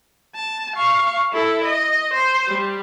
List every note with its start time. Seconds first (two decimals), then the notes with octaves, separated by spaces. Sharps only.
0.35 A5
0.76 F5 C#6
1.32 E4 A4
1.65 D#5
2.14 C5
2.48 G3